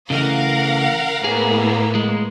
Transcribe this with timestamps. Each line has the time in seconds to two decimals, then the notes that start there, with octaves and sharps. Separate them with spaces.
0.10 C#3 E3 A3 A#4 F5 F#5
1.24 A2 A#3 B3 G#4
1.95 G#3